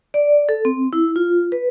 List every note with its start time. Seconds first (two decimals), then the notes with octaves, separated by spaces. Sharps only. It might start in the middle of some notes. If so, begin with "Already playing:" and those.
0.14 D5
0.49 A4
0.65 C4
0.93 E4
1.16 F4
1.52 B4